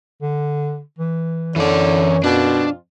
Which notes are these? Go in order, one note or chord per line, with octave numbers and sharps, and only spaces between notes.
D3
E3
F#2 D3 E3 C#5 D5
F2 B2 D4 F4